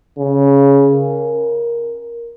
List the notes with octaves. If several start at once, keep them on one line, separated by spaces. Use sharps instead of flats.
C#3
A#4